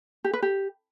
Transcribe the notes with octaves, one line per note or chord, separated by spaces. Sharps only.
G4
B4
G4